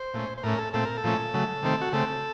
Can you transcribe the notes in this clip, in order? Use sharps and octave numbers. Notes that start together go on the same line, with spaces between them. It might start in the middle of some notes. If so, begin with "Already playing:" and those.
Already playing: C5
A#2 A3 C#4
C5
A2 A3 C#4 A#4
A4
A#2 A3 C4 A4
A#4
A4
A#2 F3 A3 C#4
C#3 F#3 A3
C3 D#3 A3 C4
F#4
C#3 A3 C4 A4